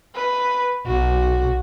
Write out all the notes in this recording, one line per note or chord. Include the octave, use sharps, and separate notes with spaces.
B4
B1 F#4